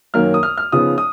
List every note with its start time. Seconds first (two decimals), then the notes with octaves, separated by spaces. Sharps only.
0.14 F#2 D#3 F#3 A#3 F6
0.34 D#6
0.43 F6
0.58 F6
0.72 C#3 F3 B3 D#4 D#6
0.98 D#6